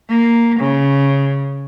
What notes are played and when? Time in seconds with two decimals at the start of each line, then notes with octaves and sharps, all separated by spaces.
0.10 A#3
0.60 C#3